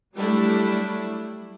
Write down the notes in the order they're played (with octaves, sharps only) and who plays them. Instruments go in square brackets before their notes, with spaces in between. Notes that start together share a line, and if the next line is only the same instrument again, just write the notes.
[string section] F#3 G3 A3 D4 E4